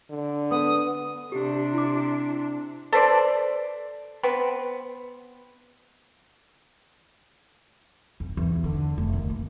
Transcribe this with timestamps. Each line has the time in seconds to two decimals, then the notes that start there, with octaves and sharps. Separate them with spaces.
0.10 D3
0.51 B3 B4 D#6
1.32 C3 D4 G4
1.73 E4 D6
2.92 A4 B4 C5 D5
4.23 B3 C4 B4
8.20 F2
8.37 E2
8.64 D3
8.98 F1
9.13 D#2
9.30 A#3